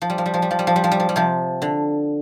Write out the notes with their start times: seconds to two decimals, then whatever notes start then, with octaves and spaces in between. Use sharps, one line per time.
0.02 F3
0.10 G3
0.18 F3
0.26 G3
0.34 F3
0.42 G3
0.51 F3
0.59 G3
0.67 F3
0.76 G3
0.84 F3
0.92 G3
1.00 F3
1.09 G3
1.16 C3 F3
1.62 D3